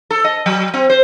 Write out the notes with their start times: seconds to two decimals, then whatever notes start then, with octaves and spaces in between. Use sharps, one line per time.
0.10 A4
0.24 D#5
0.46 F#3
0.74 C4
0.90 C5